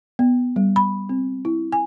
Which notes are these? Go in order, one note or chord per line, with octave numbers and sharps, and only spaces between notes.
B3
G3
B5
C4
E4
G#5